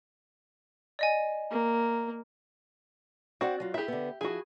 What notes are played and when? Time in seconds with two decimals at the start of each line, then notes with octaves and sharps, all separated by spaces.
0.99 D5 D#5 G#5
1.51 A#3
3.41 C4 F#4 D5 F#5
3.60 F#3 F4
3.74 E4 G4 G#4 E5
3.88 D3 B3
4.21 F3 E4 F#4 G#4